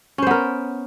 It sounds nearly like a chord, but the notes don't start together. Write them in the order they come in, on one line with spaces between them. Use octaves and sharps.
C#4 C5 B3 A#4